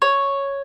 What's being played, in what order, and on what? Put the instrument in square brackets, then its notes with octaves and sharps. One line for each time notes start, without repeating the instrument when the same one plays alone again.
[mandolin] C#5